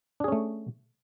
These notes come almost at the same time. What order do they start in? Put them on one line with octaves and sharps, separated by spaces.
D4 G#4 C#4 A3